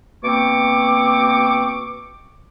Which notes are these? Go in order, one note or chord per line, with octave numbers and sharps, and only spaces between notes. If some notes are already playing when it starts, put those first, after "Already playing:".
B2 A#3 C4 C#6 D6